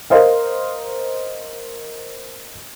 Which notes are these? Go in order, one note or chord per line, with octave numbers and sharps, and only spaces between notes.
A#4 C5 D#5 F5